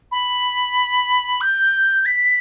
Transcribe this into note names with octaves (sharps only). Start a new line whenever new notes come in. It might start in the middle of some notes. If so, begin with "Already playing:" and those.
B5
G6
B6